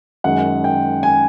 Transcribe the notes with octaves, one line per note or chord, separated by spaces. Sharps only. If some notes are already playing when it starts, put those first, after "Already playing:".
F#2 D#3 G#3 F#5
G5
G#5